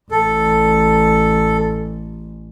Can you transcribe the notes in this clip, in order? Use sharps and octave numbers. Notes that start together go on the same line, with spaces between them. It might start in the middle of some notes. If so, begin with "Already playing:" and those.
A1 A4